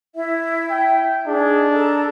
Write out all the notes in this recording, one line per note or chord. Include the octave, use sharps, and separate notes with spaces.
E4 E5
G5
D4 D#4 G#4
A4 A5 A#5